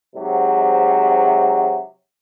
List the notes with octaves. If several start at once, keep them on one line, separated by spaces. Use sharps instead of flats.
G#2 C3 F#3